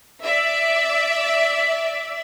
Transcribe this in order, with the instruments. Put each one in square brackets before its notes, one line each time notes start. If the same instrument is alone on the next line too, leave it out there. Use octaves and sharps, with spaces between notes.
[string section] D5 E5